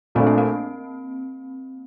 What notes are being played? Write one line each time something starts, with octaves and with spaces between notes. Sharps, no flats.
A#1 A#2 A3 C4 D4
A#3
C4